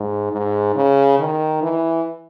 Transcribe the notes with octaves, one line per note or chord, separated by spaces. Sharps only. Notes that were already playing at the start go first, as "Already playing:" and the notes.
Already playing: G#2
G#2
C#3
D#3
E3